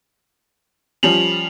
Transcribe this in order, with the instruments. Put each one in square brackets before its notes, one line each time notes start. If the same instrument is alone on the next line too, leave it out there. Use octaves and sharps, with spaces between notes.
[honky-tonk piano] F3 G3 C#4 [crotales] F7 F#7